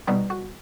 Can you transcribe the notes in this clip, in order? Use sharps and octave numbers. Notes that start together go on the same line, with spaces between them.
B2 G3 B3 D#4
F#4